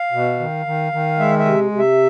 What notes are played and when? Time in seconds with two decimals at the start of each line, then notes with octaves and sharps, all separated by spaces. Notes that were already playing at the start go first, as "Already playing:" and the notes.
Already playing: F5
0.12 B2
0.40 D#3
0.66 D#3
0.92 D#3
1.19 G#3 E5
1.39 E5
1.46 C3
1.72 C3
1.79 E5